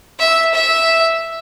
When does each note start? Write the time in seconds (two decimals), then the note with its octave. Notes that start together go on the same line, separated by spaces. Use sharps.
0.19 E5
0.54 E5